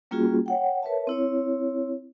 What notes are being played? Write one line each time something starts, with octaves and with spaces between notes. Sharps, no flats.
G3 A#3 C#4 F4 F#4 G#4
C#5 F#5 G5
A#4 B4 C#5 E5 A5
C4 E4 C#5